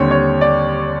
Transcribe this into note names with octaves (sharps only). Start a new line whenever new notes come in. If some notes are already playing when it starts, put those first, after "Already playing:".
Already playing: D#2 D3 G3 C4 C#5
C#5
D5